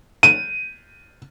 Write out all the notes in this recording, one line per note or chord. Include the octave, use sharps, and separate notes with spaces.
D#7